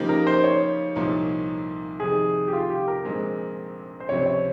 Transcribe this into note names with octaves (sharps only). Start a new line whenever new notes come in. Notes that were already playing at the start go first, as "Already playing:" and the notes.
Already playing: C#3 F3 A#3 D#4 G4
A#4
C5
C#5
C2 A#2 F3 A#3 D#4
F2 C3 D#3 G#4
G4
F4
G4
A#4
A#1 A#2 G#3 C4
C5
C#2 C3 F3 C4 C#5
C#5